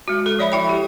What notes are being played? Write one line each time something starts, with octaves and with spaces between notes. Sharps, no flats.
G#3 F#4
A4
F3 C#5 D5 E5 B5
E4 E5 G5 B5
G4